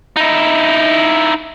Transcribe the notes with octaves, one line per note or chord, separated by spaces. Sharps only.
D#4 E4